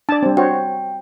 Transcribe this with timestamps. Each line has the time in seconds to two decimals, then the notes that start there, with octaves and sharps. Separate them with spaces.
0.09 D4 D5 A5
0.22 G3 C4
0.37 F#4 C5 C#5 G5